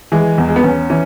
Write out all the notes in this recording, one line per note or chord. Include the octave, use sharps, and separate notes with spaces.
E3 G#3
E2
G#3
B3
E2 C#4
E3 C#4